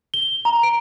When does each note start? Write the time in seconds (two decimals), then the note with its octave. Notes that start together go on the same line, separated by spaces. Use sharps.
0.14 G7
0.45 A#5
0.63 D7